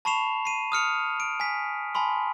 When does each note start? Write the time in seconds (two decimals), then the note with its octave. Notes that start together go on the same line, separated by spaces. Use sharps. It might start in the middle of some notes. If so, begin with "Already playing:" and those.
0.05 A5 B5 C#6 C7 E7 F7
0.45 C7 D#7
0.72 D#6 F6 C#7 F7
1.20 D7
1.40 G#5 B6
1.95 G#5 A5 B5 C6